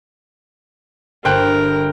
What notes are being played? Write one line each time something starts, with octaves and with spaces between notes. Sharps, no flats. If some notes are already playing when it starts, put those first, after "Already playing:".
G1 A#4 C5 G5 F#6